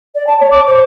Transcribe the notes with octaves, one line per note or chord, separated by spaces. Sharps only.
D5
A5
C#5
D6
C5